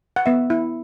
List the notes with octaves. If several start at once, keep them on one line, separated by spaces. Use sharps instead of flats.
F#5
B3 E5
E4